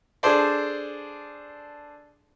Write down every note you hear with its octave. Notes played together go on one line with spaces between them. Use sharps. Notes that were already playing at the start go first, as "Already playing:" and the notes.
D4 G#4 A4 C5 D5